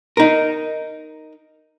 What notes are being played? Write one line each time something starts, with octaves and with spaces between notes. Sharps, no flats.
D#4 A#4